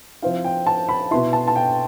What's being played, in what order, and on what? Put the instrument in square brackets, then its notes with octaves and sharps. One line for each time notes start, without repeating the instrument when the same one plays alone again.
[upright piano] F3 C4 E4 F5
G5
A5
B5
B2 B3 E4 C6
A5
A5
G5